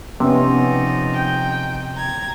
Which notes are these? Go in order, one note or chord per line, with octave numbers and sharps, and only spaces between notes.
C3 F3 B3 C#4 D#4
G5
A#5 G#6